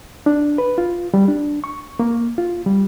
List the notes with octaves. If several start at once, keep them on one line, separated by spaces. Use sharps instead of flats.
D4
B4
F4
G3
D4
C#6
A#3
F4
G3